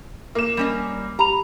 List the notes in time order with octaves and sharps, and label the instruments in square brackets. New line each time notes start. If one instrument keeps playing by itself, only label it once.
[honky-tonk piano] A#3 E7
[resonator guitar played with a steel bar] G3 C#4 D#5
[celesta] G4 B5 F7 [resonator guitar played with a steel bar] A#5